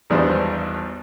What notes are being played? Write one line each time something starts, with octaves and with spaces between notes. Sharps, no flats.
G#1 E2 G3 D4 C5 F5